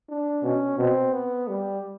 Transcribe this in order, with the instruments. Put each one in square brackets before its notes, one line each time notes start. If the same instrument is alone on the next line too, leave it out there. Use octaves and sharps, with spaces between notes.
[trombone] D4
[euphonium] B2 [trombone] C#4
[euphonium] B2 [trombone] C4
[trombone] B3
G3